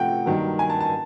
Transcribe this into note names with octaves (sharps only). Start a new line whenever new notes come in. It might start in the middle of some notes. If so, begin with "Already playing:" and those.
Already playing: C3 F3 A3 F#5 G5
G2 D#3 F#3 A#3
G#5
A5
A5